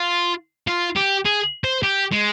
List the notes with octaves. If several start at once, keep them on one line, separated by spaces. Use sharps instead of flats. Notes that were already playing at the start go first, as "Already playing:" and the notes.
Already playing: F4
F4
G4
G#4
C5
G4
G#3